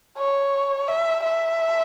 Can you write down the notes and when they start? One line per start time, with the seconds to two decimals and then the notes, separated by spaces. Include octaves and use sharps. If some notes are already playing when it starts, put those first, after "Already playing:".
0.17 C#5
0.87 E5
1.23 E5